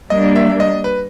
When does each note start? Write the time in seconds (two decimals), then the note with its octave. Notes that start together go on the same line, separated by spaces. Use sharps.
0.10 G3 A#3 D4 D#5
0.36 E5
0.60 D#5
0.84 B4